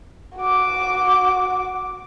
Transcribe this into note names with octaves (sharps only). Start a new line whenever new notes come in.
F#4 D6